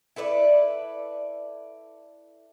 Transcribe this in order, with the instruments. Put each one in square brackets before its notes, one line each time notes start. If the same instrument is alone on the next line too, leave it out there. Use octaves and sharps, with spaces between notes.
[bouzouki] E4 A4 B4 D5